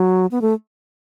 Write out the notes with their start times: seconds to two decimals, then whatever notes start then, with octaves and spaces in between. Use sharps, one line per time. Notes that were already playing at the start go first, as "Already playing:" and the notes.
Already playing: F#3
0.31 B3
0.42 A3